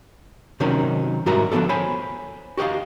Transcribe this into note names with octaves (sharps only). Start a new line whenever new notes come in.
C3 D#3 F#3 C#4 D#4 A#4
G#2 G3 F#4 A#4 E5 A#5
D3 F3 B3 G4 A4
C5 C#5 G#5 B5
F#4 G4 A#4 D#5 F5